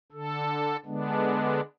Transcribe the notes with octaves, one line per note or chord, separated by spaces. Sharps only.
D3 A4
D3 G#3 B3 D4